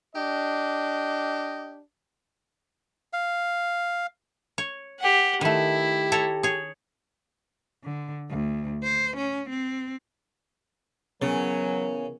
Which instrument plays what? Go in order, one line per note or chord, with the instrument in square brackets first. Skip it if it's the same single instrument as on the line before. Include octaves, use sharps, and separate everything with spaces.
[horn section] D4 G4 D#5
[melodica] F5
[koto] C#5
[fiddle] G4 F#5
[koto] D#3 A3 [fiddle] E4 [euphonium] G4
[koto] A4 C#5 A#5
G#4 C#5
[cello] D3
D2
C5
C#4
C4
[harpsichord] C#3 [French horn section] E3 G#4 A#4 [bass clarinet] F#3 [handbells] B3 C#4 G#5